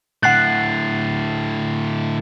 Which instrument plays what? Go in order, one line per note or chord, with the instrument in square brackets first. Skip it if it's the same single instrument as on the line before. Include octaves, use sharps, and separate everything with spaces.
[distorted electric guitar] A2 D3 [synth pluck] F#5 F#6 [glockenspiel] A6 C7